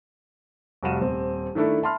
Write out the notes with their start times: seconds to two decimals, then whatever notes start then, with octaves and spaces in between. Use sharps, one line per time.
0.83 F1 G3 F#4 F5 D#7 E7
1.01 D#1 C4
1.55 D#3 A3 D4 E4 A4
1.83 E5 A5 B5 C6 F6